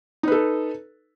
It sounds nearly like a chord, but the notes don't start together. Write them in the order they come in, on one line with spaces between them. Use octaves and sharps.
D#4 B4 A4